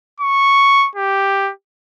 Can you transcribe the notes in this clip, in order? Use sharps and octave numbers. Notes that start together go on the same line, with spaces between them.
C#6
G4